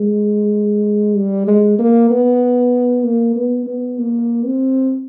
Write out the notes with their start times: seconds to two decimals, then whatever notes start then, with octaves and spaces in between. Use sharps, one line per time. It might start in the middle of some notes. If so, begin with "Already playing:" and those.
Already playing: G#3
1.16 G3
1.47 G#3
1.79 A#3
2.10 B3
3.04 A#3
3.36 B3
3.67 B3
3.98 A#3
4.45 C4